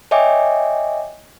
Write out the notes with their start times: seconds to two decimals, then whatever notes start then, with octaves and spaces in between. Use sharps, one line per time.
0.11 C#5 D#5 E5 G5 G#5 D6